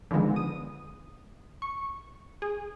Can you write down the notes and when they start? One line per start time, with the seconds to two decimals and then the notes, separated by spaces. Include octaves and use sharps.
0.11 D3 D#3 F3 G#3 B3
0.36 D#6
1.62 C#6
2.42 G#4